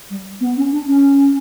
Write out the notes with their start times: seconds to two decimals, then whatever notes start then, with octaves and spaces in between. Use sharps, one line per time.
0.09 G3
0.40 B3
0.56 C#4
0.72 D4
0.87 C#4